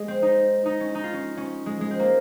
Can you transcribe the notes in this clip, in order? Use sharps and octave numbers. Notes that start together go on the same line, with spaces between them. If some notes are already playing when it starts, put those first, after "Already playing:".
Already playing: G#3
C4
D#4
D#4
C#4
D#4
F4
C#4
C#4
G#3
G#3
C4
A#3